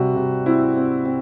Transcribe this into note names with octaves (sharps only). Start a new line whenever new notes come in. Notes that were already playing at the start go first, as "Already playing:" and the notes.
Already playing: C3 G3 F#4
C3
C4 E4
C4
C4